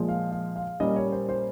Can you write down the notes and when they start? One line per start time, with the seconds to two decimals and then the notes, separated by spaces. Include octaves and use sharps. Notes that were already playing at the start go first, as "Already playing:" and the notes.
Already playing: A#2 F3 G#3
0.09 F5
0.32 F5
0.56 F5
0.80 A#2 G3 A#3 C#4 D#5
0.96 C#5
1.12 C5
1.29 C5